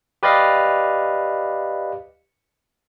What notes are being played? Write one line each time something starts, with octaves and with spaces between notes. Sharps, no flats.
G4 B4 D5 D#5 F5